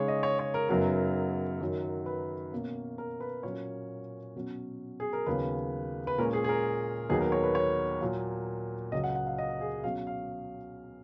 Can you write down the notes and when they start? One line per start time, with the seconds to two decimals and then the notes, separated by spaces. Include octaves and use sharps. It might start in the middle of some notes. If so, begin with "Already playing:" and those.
Already playing: C#3 G#3 D#4 C#5
0.08 D#5
0.23 C#5
0.39 C#5
0.54 A#4
0.69 F#2 C#3 F#3 B3 D#4 A#4
1.61 F#2 D#3 F#3
2.06 B4
2.52 B2 A#3 C#4
2.98 A#4
3.20 B4
3.43 A#2 F#3 A#3 C#4 C#5
4.35 B2 F#3 C#4
5.00 G#4
5.13 A#4
5.26 D#2 C#3 F#3 B3 B4
6.07 B4
6.18 A#2 G#3 C#4 A#4
6.33 G#4
6.44 G#4
6.49 A#4
7.09 D#2 D#3 F#3 B3 D#4 G#4
7.21 A#4
7.32 C#5
7.43 B4
7.55 C#5
8.01 A#2 F#3 A#3
8.92 C#2 C#3 F#3 D#5
9.04 F#5
9.15 F#5
9.27 F5
9.38 D#5
9.61 G#4
9.84 B2 F#3 C#4 F5
10.07 F5